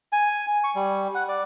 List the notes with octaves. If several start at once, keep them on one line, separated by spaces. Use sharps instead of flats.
G#5
C#6
G3
F#5
D5